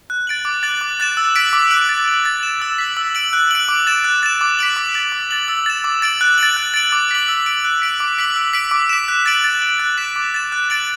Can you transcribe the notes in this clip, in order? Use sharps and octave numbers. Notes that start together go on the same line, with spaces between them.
F#6
A6 D7 F#7
D6
F#6 A6 F#7
D6
F#6 A6 E7
E6
B6 D7 F#7
D6
F#6 D7 F#7
A6
F#7
A6
E7
E6
B6 F#7
E6
D7 F#7
F#6
D7 F#7
D6
A6 E7
F#6
A6 E7
D6
B6 D7 F#7
D6
A6 F#7
D6
A6 F#7
E6
A6 E7
D6
A6 D7 F#7
F#6
A6 D7 F#7
F#6
A6 D7 F#7
D6
B6 F#7
E6
D7 F#7
F#6
B6 D7 F#7
D6
B6 D7 F#7
E6
B6 D7
D6
B6 E7
F#6
A6 D7 F#7
A6
F#7
F#6
B6 E7
D6
A6 E7
F#6
A6 D7 F#7